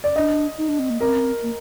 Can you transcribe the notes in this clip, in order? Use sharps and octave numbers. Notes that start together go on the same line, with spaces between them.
D5
D4 D#5
D#4
D4
C4
A#3
C4 A#4
A#3